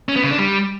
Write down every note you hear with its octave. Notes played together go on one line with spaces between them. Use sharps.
C#4
B3
C#3
D4
G3